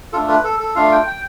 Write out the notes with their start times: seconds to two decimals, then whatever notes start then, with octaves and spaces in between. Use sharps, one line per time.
0.13 A3 D4 F4 A4
0.29 B4
0.44 A4
0.60 A4
0.75 A3 D4 F4 F5
0.92 G5
1.07 G5